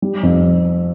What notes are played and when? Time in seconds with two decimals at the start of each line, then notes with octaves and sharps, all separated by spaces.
0.02 G3
0.23 F2